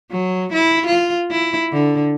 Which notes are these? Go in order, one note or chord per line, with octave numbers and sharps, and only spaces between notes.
F#3
E4
F4
E4
D3